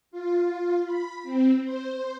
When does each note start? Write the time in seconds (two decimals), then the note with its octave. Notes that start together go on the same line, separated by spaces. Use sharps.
0.11 F4
0.85 B5
1.23 C4
1.64 C5